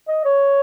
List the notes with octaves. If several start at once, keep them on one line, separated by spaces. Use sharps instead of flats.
D#5
C#5